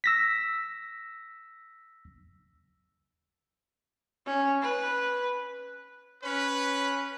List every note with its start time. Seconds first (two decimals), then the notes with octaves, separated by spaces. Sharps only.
0.04 E6 A#6 B6
4.26 C#4
4.62 B4
6.24 C#4 B4